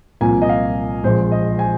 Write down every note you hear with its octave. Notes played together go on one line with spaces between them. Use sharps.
C2 A#2 F3 A#3 G#5
D#5
F5
A#1 A#2 F3 G#3 C4 C5
D#5
G#5